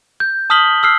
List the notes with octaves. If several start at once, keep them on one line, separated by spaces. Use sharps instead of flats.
G6
A5 D#6 F6 B6 F#7 G7
E6 F6 C7